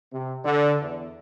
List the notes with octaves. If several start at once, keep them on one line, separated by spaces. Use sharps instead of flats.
C3
D3
E2